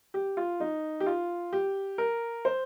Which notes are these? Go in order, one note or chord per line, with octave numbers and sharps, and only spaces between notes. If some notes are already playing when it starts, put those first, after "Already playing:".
G4
F4
D#4
G4
F4
G4
A#4
C5